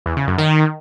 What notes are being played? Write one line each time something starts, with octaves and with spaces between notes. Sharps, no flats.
E2
C#3
F#2
D#3